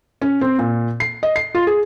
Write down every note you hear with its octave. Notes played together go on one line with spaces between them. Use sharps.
C#4
C4
A#2
C7
D#5
C7
F4
G#4